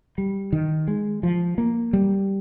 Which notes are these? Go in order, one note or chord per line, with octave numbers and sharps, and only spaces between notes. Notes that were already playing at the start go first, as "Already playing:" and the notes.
G3
D#3
G#3
F3
A#3
G3